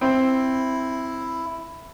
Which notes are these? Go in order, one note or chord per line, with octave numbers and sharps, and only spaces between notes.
C4 E4